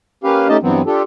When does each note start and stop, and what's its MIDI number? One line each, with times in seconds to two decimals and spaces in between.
0.24 0.48 58
0.24 0.48 61
0.24 0.48 67
0.24 0.48 71
0.24 0.48 77
0.49 0.57 57
0.49 0.57 61
0.49 0.57 63
0.49 0.57 67
0.49 0.57 75
0.49 0.57 81
0.63 0.82 43
0.63 0.82 52
0.63 0.82 54
0.63 0.82 59
0.63 0.82 60
0.86 1.03 62
0.86 1.03 65
0.86 1.03 67
0.86 1.03 69